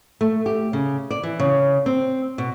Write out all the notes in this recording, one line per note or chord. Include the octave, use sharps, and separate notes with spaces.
A3
G4
C#3
D5
E3
C#3
C4
B2